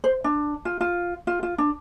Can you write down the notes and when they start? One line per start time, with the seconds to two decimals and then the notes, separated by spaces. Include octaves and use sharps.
0.04 C5
0.24 D4
0.65 F4
0.81 F4
1.27 F4
1.43 F4
1.58 D4